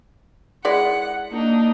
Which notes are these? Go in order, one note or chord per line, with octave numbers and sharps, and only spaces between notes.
G#3 E4 D5 F#5
A#3 D4 D#4